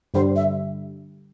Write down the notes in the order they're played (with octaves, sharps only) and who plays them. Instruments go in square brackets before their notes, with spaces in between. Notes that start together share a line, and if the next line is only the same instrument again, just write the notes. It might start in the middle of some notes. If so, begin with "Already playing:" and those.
[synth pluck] G2 D3 G3 [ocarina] C5
[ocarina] E5